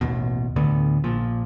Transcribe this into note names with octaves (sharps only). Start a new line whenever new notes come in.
A1 D#2 B2
D2 A2 D3 B3
A#1 A#2 F3